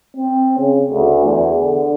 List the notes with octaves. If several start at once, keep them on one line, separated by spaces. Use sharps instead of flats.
C4
C#3
D2
E2
D3